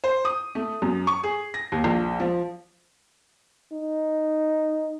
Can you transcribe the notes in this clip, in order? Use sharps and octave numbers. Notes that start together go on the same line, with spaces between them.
C5
D#6
A3
F#2
C#6
G#4
A#6
D#2
A#1
F3
D#4